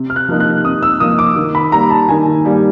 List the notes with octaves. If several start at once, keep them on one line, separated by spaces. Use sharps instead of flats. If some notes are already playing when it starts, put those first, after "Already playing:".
Already playing: C3
F6
F#6
F3 A#3 D#4
F#6
C3 D#6
E6
F3 A#3 D#4 D#6
D6
D#3
B5
G3 A#3 A#5
A5
D#3 G#5
G3 A#3